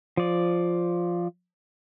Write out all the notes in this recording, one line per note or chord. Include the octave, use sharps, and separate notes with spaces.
F3 D5